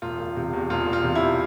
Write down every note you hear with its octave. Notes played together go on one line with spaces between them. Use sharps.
E1 F4
E1
C3
E2
E1 F4
E1
F4
C3
E4